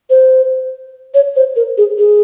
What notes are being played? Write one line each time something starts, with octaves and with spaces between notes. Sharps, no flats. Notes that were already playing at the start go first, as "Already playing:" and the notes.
C5
C#5
C5
A#4
G#4
G#4